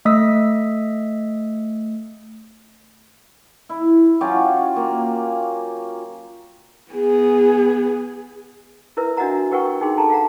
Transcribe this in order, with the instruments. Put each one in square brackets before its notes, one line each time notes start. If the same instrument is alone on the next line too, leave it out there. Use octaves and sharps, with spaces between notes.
[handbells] A3 D#5 D#6 E6 B6
[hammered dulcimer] E4
F#3 C#4 F4 G4
A#3
[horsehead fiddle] B3 G#4
[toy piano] E4 A#4 B4 E5
D4 F#4 D#5 E5 F#5 A#5
G4 A#4 B4 F#5 G5 C#6
D#4 G#4 G5 C6
A4 A5 A#5
F5 F#5 A#5